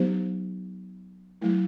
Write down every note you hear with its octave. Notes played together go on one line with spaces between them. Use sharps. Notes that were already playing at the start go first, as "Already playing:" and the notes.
Already playing: F#3 B3 D#4 G4 C5
F#3 A3 E4